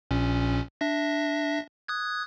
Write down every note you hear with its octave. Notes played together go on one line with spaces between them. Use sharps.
A#1 A#2 C#4
D4 E5 A#6
D#6 F#6 G#6